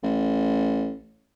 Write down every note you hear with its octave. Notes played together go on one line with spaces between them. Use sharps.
A1